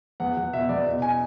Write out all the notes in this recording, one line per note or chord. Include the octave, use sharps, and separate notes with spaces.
E2 F#5
E2 F#5
B2 E5
E2 D5
B2
G#5